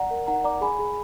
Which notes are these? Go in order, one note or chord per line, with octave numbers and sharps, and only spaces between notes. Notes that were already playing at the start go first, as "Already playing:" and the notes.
Already playing: D5 F#5 A#5
A#4
D#4 F#5 A#5
D5 A#5 D6
G#4 G#5 B5
G#4